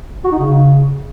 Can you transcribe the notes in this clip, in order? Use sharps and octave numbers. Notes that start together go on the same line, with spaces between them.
F#4
D#4
C#3